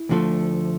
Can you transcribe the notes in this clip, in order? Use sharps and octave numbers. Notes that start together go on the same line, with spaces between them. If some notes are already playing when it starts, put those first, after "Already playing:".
Already playing: E4
D2 D3 F3 A3